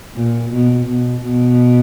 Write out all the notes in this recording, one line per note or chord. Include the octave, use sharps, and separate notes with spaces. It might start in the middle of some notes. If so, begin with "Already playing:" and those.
A#2
B2
B2
B2